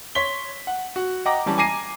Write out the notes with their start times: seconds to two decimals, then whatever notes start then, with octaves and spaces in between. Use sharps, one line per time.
0.15 C#5 C6 B6 G7
0.67 F#5
0.96 F#4
1.25 D#5 F#5 G5 A#5 D6 A#6
1.46 E3 G3 C#4 A5
1.58 G#5 A#5 D6 A#6 C7 D#7